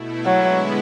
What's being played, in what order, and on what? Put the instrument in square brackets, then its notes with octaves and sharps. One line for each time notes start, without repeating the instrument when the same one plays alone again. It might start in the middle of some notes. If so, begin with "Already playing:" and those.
Already playing: [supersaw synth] B2 A3 E4
[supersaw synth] D3 G#3 B3 E4 [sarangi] F#3